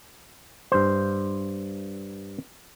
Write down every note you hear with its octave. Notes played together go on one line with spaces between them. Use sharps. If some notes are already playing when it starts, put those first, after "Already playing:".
G2 C5